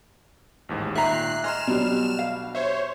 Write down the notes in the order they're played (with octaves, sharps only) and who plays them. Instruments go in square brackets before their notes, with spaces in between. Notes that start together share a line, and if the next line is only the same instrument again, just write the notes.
[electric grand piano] A1 D#2 G#2
[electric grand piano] A#2 D#3 [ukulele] E5 A#5 [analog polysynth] F#6 C7
[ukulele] D#5 [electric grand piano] G#5 A#5 C6 [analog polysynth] F6 E7
[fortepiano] B2 F#3 G3 [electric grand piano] D4
[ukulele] F5
[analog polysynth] C5 C#5 [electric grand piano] E5